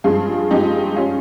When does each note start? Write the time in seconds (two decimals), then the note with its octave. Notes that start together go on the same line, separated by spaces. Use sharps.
0.04 G2 F3 G#3 F4 G#4
0.50 G2 F3 G#3 D#4 G4
0.96 G3 C#4 F4